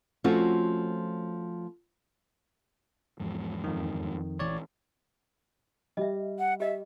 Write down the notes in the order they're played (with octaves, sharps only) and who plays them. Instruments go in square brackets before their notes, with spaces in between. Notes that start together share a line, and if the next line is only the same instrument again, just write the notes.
[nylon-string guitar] F3 A3 C4 C#4 F4 F#4
[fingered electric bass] E2 G#2 F3
[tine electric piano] F2 D#3
[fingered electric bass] A#1 E3 [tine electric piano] C#5 D5
[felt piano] G3 [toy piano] D#5 E5
[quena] F#5
[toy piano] G4 D#5 [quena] E5